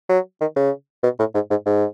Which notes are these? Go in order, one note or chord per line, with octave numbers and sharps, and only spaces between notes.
F#3
D#3
C#3
B2
A2
G#2
G#2
G#2